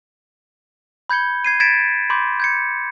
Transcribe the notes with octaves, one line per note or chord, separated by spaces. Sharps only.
B5 G6 G#6 C#7 G7
G#6 C7 D#7
G#6 A6 B6 C#7 D7 E7
B5 C6 D6 G6
G6 G#6 C#7